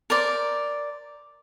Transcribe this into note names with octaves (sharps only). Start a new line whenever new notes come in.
A#4 C5 D5